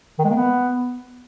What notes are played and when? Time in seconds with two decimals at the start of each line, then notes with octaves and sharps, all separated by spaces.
0.19 D#3
0.25 G#3
0.31 A#3
0.36 B3